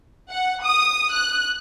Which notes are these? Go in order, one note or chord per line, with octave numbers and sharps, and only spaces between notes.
F#5
D#6
F#6